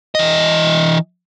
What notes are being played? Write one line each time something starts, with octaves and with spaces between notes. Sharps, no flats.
E3 D#5